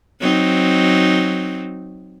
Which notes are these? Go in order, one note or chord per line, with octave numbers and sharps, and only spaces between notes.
F#3 C4 D#4